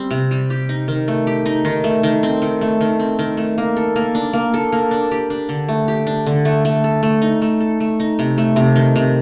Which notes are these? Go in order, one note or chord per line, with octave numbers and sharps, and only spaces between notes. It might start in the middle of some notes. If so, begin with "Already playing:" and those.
Already playing: G3 C4
C3
G3
G4
D#4
D#3
A3
G4
D#4
D#3
A3
D#3
C4
D#3
A3
D#3
C4
D#3
A3
A#3
A4
A#3
D4
A#3
A4
A#3
D4
G4
D4
D3
A3
G4
D4
D3
A3
A3
A4
A3
D#4
A3
A4
A3
D#4
C3
A3
C3
D#3
C3